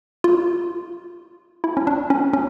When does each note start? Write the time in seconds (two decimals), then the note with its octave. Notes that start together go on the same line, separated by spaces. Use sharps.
0.24 F4
1.64 E4
1.77 C#4
1.87 D4
2.10 C#4
2.33 C#4